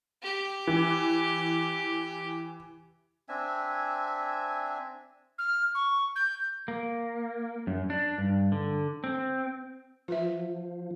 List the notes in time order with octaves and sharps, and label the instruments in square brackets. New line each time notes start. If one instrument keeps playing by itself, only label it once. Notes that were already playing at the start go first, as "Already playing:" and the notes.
[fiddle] G4
[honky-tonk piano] E3
[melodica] C4 D4 E5 G#5
[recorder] F6
C#6
G6
[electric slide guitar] A#3
F#2
D4
G2
D3
C4
[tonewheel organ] F3 [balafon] F4 B4 E5